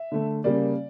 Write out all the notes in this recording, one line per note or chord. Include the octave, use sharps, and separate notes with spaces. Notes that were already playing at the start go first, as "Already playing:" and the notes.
Already playing: E5
D3 A3
C#3 G3 A#3 D5